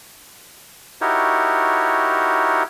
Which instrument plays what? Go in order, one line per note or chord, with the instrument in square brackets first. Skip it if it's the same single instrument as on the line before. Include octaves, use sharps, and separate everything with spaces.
[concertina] D#4 E4 F#4 G4 A#4 C#5